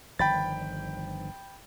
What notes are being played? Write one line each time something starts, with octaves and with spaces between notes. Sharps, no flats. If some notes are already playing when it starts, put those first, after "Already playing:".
G1 D#3 F3 G5 B5 A6